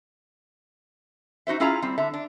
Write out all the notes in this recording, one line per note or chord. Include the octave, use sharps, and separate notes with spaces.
D#4 F#4 C5 E5
C#4 E4 F4 G#4 F5 A#5
G3 C4
D3 E5 A5
D4